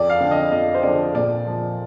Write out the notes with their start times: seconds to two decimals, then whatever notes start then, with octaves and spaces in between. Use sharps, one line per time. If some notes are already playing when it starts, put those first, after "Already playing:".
Already playing: F2 D5
0.10 F5
0.21 D3 F3
0.31 D#5
0.52 F2 D#5
0.75 C5
0.83 D3 F3 D5
1.15 A#2 D5
1.47 F3